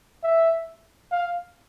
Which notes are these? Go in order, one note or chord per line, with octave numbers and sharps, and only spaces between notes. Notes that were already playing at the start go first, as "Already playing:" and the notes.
E5
F5